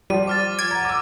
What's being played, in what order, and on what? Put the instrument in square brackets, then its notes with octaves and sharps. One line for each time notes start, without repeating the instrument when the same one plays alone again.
[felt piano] F3 [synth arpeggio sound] G3 [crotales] D#7
[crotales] D6 F6 A6
[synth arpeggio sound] G#6 [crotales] D7
[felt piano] F#5 A#5
D6 E6